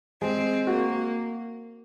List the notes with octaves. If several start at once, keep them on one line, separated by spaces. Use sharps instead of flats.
G#3 C4
A#3 F#4